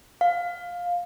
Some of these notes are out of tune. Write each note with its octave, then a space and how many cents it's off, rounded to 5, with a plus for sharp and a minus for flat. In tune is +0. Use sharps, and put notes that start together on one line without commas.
F5 +15